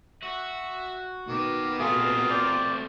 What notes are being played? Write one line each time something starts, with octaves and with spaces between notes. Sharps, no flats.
F#4 E5
B2 D#3 D6
A3 C4 F4 G#4 A#4
C5 D5